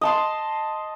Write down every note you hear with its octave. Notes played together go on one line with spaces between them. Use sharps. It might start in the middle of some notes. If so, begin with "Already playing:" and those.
D#5 A5 C6